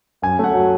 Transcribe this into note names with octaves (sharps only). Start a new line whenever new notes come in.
F#2 G#5
A3 F#5
F#3